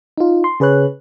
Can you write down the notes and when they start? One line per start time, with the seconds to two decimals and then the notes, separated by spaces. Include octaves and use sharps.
0.18 D#4 F4
0.44 C6
0.60 C#3 G#4 B4 C#5 F#6